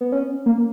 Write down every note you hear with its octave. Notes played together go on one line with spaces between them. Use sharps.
B3
C#4
A#3